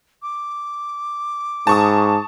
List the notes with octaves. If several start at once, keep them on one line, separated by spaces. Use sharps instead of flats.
D6
G#2 A5 C#6 D#6